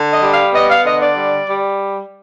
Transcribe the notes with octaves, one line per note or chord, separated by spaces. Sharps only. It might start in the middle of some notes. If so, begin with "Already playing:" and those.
Already playing: D3
D#5
G3
F5
B3 D#5
F5
D3 D#5
D5
G3
G3